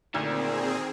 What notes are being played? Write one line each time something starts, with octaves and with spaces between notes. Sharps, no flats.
D2 A#2 D#3 C4 G#4